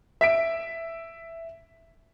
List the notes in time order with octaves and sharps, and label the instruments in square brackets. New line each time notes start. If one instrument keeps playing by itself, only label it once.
[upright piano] E5 B6 D7